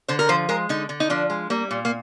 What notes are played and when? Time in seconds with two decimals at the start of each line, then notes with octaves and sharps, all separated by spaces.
0.08 D3 C5
0.19 A#4
0.29 F3 C5
0.49 G#3 A#4
0.69 D3 D#4
0.89 D3
1.00 D#4
1.10 F3 D4
1.30 G#3
1.50 G3 A#3
1.71 A#2
1.85 A#3